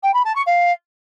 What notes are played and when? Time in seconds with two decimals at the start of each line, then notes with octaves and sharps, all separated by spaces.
0.03 G5
0.14 B5
0.25 A5
0.35 C#6
0.46 F5